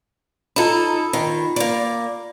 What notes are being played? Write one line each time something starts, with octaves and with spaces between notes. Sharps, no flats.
D#4 F4 A4 B5
D#3
A#3 D5